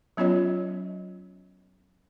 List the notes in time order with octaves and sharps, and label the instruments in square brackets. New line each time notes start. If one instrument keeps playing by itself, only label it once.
[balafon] F#3 B3 C#4 F4 C#5 D#5